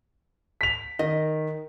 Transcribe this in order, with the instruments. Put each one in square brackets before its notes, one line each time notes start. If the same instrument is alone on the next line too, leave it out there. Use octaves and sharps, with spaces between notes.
[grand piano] B6 F7
[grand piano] D#3 [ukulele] D#5